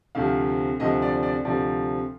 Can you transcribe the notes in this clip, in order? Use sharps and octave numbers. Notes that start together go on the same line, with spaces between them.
D2 C3 F3 F5
D2 C3 F3 D#5
D5
D5
D2 C3 F3 D5